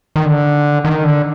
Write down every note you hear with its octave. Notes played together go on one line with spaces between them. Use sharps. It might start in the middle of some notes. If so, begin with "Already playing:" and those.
D#3
D3
D#3
D3